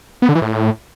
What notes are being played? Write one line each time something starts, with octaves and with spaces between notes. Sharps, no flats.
B3
D3
E3
A2